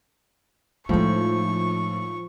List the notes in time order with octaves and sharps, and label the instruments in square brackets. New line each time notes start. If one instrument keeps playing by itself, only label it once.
[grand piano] A2 [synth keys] F3 [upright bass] G#3 D#4 [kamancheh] C#6